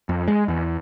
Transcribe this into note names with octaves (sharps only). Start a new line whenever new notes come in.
F2
G#3
E2